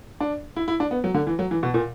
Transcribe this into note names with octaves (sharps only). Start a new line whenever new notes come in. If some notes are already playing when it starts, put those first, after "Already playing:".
D4
E4
E4
D4
B3
F#3
D3
E3
F#3
E3
B2
A#2